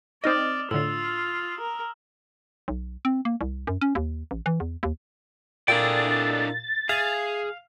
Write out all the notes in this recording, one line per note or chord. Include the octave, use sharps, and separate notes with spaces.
C4 D#4 D5 D#5 D#6 F6 E7
A2 D3 F4 E6
A#4
B1
C4
A#3
C2
F#2
C#4
D#2
A1
E3
E2
D#2
A#2 D4 E4 G#4 A4 D5 G5 A6
G#4 E5 F5